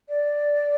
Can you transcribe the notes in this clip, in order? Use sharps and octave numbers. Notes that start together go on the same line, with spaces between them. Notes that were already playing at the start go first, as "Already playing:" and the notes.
D5